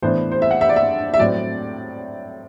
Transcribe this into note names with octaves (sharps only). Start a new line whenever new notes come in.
A2 E3 B3 D4 C5
C5
E5
F#5
E5
D5
E5
E5
A2 F#3 C4 D5